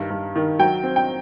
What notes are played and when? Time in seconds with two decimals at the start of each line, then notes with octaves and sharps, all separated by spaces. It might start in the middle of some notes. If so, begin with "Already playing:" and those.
Already playing: G2 D#3
0.10 G2
0.36 D#3
0.59 F#3 G5
0.83 C4
0.96 G5